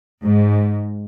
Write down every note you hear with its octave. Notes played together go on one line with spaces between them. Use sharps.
G#2